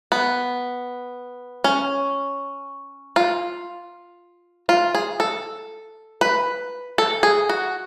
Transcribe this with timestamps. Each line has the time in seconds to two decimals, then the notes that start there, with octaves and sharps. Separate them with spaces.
0.12 B3
1.64 C#4
3.16 F4
4.69 F4
4.95 G#4
5.20 A4
6.21 B4
6.98 A4
7.23 G#4
7.49 F#4